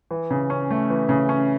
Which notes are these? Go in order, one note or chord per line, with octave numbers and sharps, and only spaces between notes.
E3
C#3
C#4
A3
E3
C#3
C#4